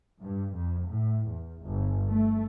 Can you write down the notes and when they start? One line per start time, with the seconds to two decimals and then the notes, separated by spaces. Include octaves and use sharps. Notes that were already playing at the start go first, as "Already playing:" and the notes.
0.20 G2
0.54 F2
0.87 A2
1.28 E2
1.62 G1
2.11 A3